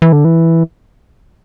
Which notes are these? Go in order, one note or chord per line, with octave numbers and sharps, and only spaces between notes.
E3
D3
E3